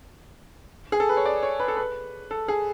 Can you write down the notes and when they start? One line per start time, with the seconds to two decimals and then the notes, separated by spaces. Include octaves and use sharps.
0.92 G#4
1.00 A4
1.09 B4
1.17 C#5
1.25 D5
1.43 C#5
1.60 B4
1.68 A4
1.77 B4
2.31 A4
2.48 G#4